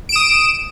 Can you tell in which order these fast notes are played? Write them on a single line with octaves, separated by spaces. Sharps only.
D7 E7 D#6